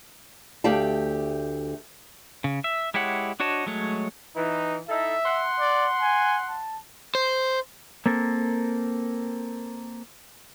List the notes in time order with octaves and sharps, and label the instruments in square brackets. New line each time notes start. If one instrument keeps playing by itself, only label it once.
[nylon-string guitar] D2 A3 G4 D5 F5 A5
[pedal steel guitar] C#3
E5
G#3 E4 G4 C#5 F#5
D4 F#4 C#5 D#5 A5
F#3 G#3 A3 C#5
[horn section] E3 [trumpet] D#4
[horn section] D#4 E4 A4 [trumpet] E5
[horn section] F#5 C6
[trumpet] D5
G#5
A5
[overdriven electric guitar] C5
[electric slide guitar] A#3 C4 A4 A#4